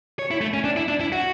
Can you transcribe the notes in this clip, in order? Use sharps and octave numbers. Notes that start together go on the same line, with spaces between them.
C#5
E4
A3
C#4
D4
E4
D4
E4
F#4